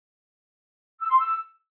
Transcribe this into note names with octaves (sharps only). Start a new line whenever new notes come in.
E6
C6
E6